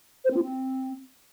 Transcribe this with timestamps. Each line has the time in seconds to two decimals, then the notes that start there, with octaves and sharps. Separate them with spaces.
0.24 C5
0.30 C4
0.36 F4
0.42 C4